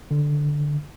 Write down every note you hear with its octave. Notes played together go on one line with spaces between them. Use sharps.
D3